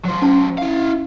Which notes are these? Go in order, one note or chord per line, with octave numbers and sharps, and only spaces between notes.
F#3 C5
C#4 A5
E4 F5